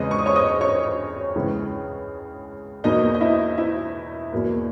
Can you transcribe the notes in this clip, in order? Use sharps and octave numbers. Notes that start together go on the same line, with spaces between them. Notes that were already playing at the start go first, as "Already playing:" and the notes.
Already playing: E2 C#3 G#3 B3 D#5 D#6
C#6
D#6
C#5 C#6
D#5 D#6
C#5 C#6
C#2 C#3 E3 G#3 B3
E2 B2 A#3 D#4 D#5
D#5
E4 E5
E4 E5
E2 B2 A#3